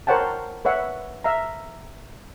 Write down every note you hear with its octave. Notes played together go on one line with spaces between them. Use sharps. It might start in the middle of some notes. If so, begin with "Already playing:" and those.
A#4 C5 C#5 F#5 G5 A5
B4 C#5 E5 F#5
E5 F5 A#5